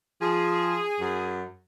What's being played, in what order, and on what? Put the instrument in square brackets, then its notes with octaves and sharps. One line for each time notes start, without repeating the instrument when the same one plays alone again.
[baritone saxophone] F3 [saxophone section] G#4
[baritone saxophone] F#2